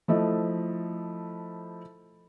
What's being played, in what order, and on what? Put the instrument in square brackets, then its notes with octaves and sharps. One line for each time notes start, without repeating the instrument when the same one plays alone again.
[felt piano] F3 A3 E4 D#5